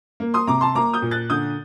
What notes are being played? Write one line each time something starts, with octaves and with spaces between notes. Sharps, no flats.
A#3
C6 D#6
C3 A#5 D6
A5 C6
A#3 A#5 D6
D#6 G6
A#2
F#6 A6
D3 D#6 G6